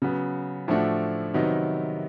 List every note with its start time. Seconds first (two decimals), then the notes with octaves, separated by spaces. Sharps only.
0.02 C#3 F#3 B3
0.68 A2 F3 A3 D4 F#4
1.34 C3 D#3 F#3 B3 D#4